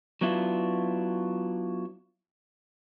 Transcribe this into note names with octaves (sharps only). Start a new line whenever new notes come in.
F#3 B3 D4 E4 F4